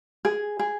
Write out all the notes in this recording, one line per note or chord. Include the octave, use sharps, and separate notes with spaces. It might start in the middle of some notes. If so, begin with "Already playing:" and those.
G#4
G#4